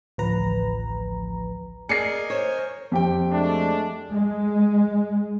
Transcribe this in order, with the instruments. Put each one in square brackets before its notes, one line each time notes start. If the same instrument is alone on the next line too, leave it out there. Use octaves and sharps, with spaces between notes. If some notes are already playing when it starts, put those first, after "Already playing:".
[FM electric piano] A1 D2 F3 B4 A#5
[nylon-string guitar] G#4 D5 [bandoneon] A#4 D#5 G#5 [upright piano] C7 C#7
[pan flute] C5 [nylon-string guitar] C#5
[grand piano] F2 G4 G5
[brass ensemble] G#3 A3 D4
[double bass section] G#3